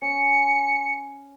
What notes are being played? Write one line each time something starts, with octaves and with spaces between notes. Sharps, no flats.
C#4 C#7